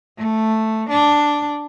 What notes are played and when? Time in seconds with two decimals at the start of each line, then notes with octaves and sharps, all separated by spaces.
0.18 A3
0.89 D4